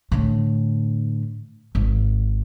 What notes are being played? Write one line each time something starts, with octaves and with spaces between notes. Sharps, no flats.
A2 D3
G#1